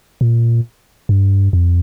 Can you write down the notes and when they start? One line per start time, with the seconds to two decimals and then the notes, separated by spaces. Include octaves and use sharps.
0.21 A#2
1.09 G2
1.53 F2